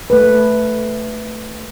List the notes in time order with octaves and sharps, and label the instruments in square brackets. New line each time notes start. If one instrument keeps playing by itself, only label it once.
[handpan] A3 B4